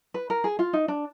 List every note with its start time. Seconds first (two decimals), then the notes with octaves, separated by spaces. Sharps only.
0.14 B4
0.30 A#4
0.44 G#4
0.59 F4
0.73 D#4
0.88 D4